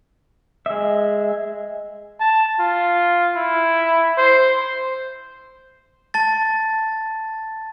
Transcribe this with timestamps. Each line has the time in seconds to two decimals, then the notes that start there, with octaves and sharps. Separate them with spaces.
0.66 G#3 E5
2.20 A5
2.60 F4
3.36 E4
4.18 C5
6.14 A5 A6